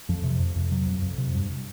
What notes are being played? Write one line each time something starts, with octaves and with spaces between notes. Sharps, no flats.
F2 F3
C3
F2
F2
C3 F#3
F2
F2
C3
G2